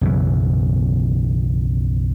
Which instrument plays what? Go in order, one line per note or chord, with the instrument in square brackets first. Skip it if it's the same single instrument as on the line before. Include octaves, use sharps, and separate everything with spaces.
[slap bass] B1 F#2 C#3 E3